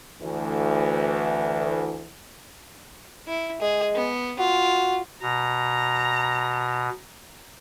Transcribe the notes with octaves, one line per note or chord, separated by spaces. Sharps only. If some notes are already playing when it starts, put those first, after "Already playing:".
D2 E3
E4
G#3 G#4
B3
F4 F#4
B2 A#5